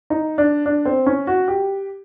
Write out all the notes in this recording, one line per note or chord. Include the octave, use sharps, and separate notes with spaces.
D#4
D4
D4
C4
C#4
F#4
G4